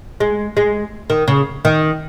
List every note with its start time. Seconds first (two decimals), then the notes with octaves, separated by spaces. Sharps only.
0.20 G#3
0.57 G#3
1.10 D#3
1.28 C#3
1.65 D#3